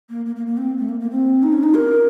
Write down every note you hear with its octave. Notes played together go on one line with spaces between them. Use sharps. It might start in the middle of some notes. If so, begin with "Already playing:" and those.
A#3
A#3
A#3
A#3
C4
A3
A#3
A#3
C4
D#4
C#4
D#4
A#4